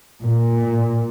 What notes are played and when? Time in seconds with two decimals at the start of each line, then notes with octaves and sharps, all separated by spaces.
0.22 A#2